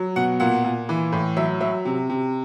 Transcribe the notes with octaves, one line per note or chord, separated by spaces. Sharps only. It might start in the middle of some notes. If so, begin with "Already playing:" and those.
Already playing: F#3
B2 F#5
A#2 F#5
A#2
E3
A2
F#3 E5
F#3 E5
C3
C3